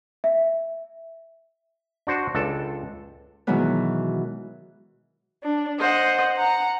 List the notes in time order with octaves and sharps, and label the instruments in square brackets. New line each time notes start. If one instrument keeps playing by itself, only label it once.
[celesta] E5
[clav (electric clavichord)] D4 F#4 C5
C#2 D4 A4
[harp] B2 D#3 E3 F#3 G#3 B3
[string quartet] D4
C5 D#5 F#5
F#5 A#5